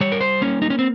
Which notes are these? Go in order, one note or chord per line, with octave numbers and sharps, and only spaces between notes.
G3 C#5
A#4
C5
A#3 C#4
D#4
C#4
C4